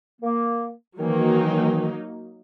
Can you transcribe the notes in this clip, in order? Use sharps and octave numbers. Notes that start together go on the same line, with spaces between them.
A#3
D#3 E3 F#3 A#3 D#4